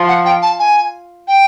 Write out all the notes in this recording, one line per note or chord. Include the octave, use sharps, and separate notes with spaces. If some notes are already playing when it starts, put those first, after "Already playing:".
Already playing: F3
F#5
G5
A5
G#5
G5